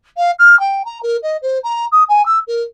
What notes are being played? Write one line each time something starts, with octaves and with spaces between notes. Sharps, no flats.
F5
F6
G5
A#5
A#4
D#5
C5
A#5
D#6
G#5
E6
A#4